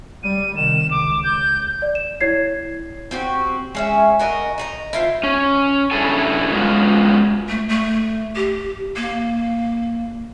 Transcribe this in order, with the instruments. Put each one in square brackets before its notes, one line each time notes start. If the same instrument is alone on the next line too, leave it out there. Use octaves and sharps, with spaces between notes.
[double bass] G3 [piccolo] D#7
[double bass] C3 D#3 [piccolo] E7
[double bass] C#2 [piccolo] D6
[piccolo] G6
[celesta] D5
E7
E4 C#5 G#6 C7
[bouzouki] C4 F#4 G4
G#3 C#4 E5
F#4 A#4 D#5
D#5 F#5 A#5
E4 F4 C5
[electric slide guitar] C#4
G2 C#3 E4 A4 G#5
F#3 G#3 B3 C#4 F4
[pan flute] A3
A3
G4
A#3